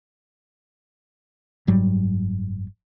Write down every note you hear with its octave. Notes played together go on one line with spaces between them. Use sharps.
F#1 G#2 F#3 G3